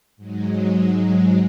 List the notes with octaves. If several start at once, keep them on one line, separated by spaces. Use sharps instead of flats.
G#2 F#3 G#3